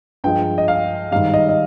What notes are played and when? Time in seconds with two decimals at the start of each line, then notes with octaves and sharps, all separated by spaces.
0.24 G2 F3 G#3 G5
0.58 D#5
0.68 F5
1.11 G#2 D#3 G3 F5
1.34 D#5
1.49 D#5